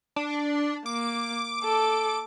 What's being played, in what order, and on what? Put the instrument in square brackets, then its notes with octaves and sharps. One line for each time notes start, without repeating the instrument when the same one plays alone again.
[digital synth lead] D4
[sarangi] A#3 [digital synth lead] D6
[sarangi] A4